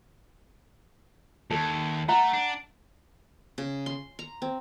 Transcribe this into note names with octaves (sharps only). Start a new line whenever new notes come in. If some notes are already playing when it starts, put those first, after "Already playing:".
D#2 A4
A3 F#5 A#5
D4
C#3
C6
A#5
C4